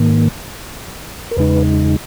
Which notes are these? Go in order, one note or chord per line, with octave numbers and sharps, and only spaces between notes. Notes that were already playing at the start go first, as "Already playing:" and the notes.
Already playing: G#2 D#3 A#3
A#4
E2 C#3 G#3 D#4 B4